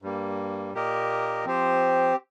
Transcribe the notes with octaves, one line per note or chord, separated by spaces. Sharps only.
G2 G3 A#3
A#2 A#3 G4 A#4 D#5
F3 C4 G4 C5